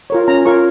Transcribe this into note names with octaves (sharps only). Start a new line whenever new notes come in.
F4 A#4 C#5
C#4 A#5
F4 A#4 C#5 C#6